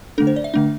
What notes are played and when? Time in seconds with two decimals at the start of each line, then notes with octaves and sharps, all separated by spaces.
0.18 D3 A3 D4 A4
0.27 C5
0.36 D5
0.44 E5
0.54 D3 A3 D4